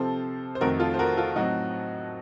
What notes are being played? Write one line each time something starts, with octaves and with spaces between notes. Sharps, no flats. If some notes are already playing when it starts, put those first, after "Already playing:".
Already playing: C3 F3 C4 A4 C5
C5
F2 D#3 A3 C4 F#4 A#4
F4 A4
C5
F#4 A#4
F4 A4
A2 F#3 C4 D#4 F#4